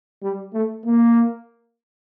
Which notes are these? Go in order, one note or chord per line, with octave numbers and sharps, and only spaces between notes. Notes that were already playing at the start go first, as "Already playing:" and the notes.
G3
A3
A#3